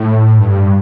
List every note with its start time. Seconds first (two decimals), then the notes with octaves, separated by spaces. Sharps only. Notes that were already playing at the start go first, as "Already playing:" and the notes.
Already playing: A2
0.39 G2